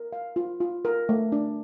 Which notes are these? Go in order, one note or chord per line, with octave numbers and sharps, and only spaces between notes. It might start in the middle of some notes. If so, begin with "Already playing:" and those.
Already playing: A#4
F5
F4
F4
A#4
A3
D4